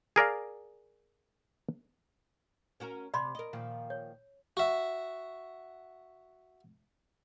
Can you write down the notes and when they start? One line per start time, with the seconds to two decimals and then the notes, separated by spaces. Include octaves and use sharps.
0.16 G#4 A#4 D5 F5
2.80 C#4 F#4 A#4
3.14 C3 D5 B5 C6
3.35 A#4 D#5
3.53 A#2 D#3 F3
3.90 C#5
4.57 F#4 E5